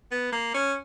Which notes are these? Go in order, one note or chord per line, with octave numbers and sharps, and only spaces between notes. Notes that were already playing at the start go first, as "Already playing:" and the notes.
B3
A#3
C#4